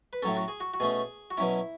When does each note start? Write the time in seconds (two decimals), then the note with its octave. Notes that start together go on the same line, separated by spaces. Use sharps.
0.13 B4
0.23 A2 F#3 C#4 A4
0.37 F#4
0.48 G#4
0.60 F#4
0.74 F#4
0.80 B2 A3 C#4 G#4
1.31 F#4
1.37 B2 F#3 C#4 E4